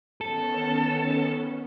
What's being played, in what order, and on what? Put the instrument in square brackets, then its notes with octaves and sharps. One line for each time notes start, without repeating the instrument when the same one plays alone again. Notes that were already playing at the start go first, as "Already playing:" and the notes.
[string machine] D#3 B3 C#4 [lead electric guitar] A4